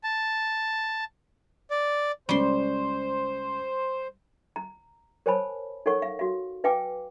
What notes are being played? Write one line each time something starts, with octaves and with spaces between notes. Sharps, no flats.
A5
D5
C#2 G3 C#4 C5 C6 C#6
A#5
A#4 C5 C#5 G#5 A5 B5
D#4 A4 A#4 C#5 F#5 C#6
F5
F#4 F5
B4 F5 G5 G#5 D6